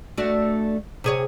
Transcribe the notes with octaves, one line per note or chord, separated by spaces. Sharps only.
A3 D4 F#4
C3 G#4 C#5